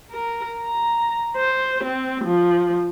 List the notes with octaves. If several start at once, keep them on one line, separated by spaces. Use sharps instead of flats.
A#4
A#5
C5
C4
F3